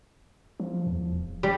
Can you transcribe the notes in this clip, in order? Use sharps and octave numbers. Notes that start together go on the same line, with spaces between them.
F3
E2
D1
G3